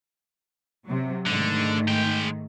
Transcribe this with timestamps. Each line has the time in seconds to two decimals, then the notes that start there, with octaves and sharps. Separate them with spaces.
0.86 C3 F#3
1.26 G#2 D3 D#3 A3
1.88 G#3 G5